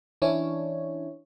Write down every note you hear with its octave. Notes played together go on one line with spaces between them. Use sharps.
E3 C#4 D4 E4 C#5